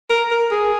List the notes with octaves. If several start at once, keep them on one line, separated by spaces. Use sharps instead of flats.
A#4
A#4
G#4